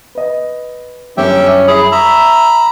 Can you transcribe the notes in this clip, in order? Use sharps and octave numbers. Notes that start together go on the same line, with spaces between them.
B4 D#5
G1 F#2 C#4 G4 E5 G5
E4 G#4
E5 A#5 B5 C#6